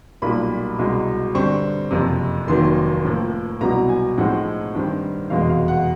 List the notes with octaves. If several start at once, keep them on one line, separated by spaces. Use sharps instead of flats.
B1 A#2 G3 A#3 B5
C2 B2 G#3
G2 D3 G3 C4 C#6
F#1 F2 C3
F1 D#2 D#3 F#3 A#3 C6
A2 F3 A#3
C2 B2 F#3 B3 E4 A#5
G#5
A2 F3 G#3 C4 D#4 F#5
G2 D#3 G3 C4
F1 E2 B2 G#3 F5
F5
F#5